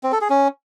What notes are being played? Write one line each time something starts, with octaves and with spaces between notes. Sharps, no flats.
C4
A4
G#4
C#4